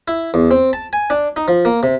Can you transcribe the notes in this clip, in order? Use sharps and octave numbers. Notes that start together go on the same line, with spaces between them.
E4
E2
C4
A5
G#5
D4
D#4
F3
A#3
C3